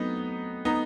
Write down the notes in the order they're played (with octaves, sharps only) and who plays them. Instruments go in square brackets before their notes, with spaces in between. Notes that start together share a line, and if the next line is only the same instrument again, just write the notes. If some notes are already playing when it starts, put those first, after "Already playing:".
Already playing: [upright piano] F#3 A3 C4 [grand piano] B3 D#4
[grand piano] B3 D#4